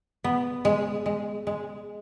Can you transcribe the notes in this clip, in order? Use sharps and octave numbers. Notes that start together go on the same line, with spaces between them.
B3
G#3
G#3
G#3